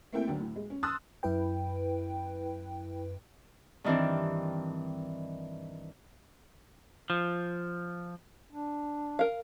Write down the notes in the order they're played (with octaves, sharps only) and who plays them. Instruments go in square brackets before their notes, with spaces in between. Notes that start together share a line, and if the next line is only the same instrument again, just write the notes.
[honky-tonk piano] A3 A#3 C4 E4 G5
D2 F#3 D4
A2
G#3
C#4
A5 C6 D#6 E6 F#6 A6
[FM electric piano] F#2 E4 B4 G5
[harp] G2 D#3 E3 C4 D4
[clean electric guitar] F3
[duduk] D4
[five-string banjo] A#4 F5